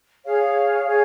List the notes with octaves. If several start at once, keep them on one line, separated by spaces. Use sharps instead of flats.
G#4 C#5 F5
G#4 C#5 F5